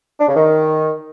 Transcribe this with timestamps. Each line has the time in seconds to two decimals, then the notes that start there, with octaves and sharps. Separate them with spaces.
0.20 D4
0.28 C#3
0.36 D#3